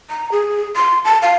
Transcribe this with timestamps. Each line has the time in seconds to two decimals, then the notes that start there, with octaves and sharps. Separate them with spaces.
0.10 A#5
0.32 G#4
0.76 C6
1.05 A5
1.22 F5